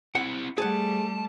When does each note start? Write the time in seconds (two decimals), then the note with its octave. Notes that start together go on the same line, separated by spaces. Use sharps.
0.15 C4 E4 F#5
0.58 G3 A3 G#4 C5 F#5 A5